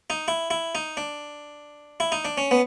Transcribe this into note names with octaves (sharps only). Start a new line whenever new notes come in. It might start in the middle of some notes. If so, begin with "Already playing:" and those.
D#4
E4
E4
D#4
D4
E4
D#4
D4
C#4
B3